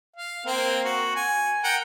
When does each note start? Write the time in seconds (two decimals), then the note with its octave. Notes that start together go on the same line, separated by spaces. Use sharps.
0.16 F5
0.46 A#3 C4 A#4
0.85 F#4
1.16 G#5
1.64 A#4 F#5 G5